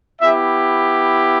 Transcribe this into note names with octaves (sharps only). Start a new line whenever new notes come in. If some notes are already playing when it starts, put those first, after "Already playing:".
B3 E4 G4 E5